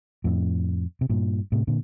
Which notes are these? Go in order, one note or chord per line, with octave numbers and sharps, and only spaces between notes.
F2 A2
C3
G2 A#2
A2 C3
A#2 D3